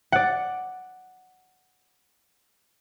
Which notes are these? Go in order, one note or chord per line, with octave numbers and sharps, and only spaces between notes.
D5 F#5